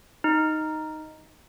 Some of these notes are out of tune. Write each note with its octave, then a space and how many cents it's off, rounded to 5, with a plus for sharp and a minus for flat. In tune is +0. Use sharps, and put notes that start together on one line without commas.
D#4 +0